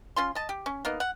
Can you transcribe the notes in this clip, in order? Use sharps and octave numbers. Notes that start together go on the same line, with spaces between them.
C#4 F4 C6
D#5 A5
G4
C#4
A#3 B3 D#4
F#5